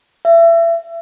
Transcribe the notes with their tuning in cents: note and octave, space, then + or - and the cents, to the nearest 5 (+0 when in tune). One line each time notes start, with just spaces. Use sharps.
E5 +30